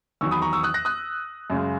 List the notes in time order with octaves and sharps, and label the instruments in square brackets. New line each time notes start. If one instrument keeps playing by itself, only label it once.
[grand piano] E2 D#3 F#3 C#6 E6
B5 D#6
A#5 C#6
C#6 E6
D#6 F#6
F#6 A#6
D#6 F#6
F#2 C#3 G#3